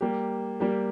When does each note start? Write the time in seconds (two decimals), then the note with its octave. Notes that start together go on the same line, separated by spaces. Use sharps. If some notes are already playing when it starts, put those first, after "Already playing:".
0.01 G3 A#3 G4
0.60 G3 A#3 G4